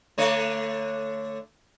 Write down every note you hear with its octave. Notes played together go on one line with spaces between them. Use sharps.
D3 A3 C#5